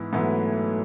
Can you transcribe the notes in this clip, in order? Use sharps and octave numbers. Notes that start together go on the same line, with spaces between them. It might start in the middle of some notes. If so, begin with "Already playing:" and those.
Already playing: G#2 E3 B3 E4
G#2 E3 F#3 A3 B3 E4